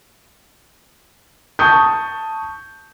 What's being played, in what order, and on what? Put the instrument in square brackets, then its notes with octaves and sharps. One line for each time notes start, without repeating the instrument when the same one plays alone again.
[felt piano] A5 C#6 D#6 G6